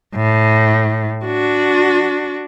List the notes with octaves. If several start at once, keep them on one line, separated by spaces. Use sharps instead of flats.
A2
D4 F#4